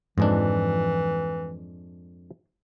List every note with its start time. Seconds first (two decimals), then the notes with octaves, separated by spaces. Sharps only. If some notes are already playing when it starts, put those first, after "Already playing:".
0.18 F2 G#2 E3 F3 G#3 D4